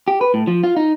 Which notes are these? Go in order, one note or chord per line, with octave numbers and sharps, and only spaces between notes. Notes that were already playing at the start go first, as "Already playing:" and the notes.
G4
B4
A2
F3
F4
D#4